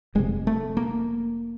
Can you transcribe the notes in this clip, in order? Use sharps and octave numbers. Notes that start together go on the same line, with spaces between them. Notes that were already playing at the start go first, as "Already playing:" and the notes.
F1 F2 C3 G#3
A3
A#3